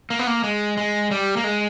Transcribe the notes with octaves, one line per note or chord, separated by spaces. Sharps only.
A#3
B3
A#3
G#3
G#3
G3
A#3
G#3